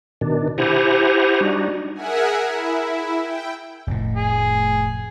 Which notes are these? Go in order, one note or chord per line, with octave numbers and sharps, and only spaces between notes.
B2 D#3 D4
E4 G4 C5 F#5 G#5 A#5
G3 D4 D#4 F#4
G#4 A#4 E5 F#5 G#5
E4
G5
F1 A2
G#4